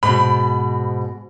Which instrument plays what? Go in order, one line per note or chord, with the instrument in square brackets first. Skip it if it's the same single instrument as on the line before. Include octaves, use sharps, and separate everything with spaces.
[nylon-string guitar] G#2 B2 [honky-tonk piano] B5